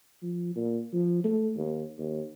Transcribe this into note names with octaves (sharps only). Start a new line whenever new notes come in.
F3
A#2
F3
A3
D#2
D#2